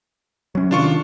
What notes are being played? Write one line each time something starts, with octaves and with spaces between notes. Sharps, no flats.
F#3 C#4
C3 D#3 D4 F4 C#6